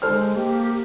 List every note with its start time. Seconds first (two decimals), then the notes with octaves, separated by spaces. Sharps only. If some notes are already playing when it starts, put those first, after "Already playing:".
0.02 G#3 A4 C5 F6
0.35 A#3 G4